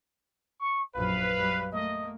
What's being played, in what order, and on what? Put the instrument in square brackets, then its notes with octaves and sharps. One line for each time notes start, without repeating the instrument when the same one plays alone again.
[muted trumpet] C#6
[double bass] A#1 F#2 [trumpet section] B4 [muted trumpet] F5
[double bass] F#2 G3
[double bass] A3 A#3 [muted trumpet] D#5